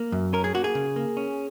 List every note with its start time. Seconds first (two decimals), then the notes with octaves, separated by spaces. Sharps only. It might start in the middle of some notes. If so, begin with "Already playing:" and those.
Already playing: A#3
0.12 F#2
0.33 C#4 A#4
0.44 G#4
0.54 A#3 F#4
0.64 G#4
0.75 C#3
0.96 A#3
1.17 C#4